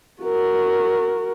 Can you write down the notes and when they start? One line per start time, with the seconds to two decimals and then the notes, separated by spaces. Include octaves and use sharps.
0.22 F#4 A#4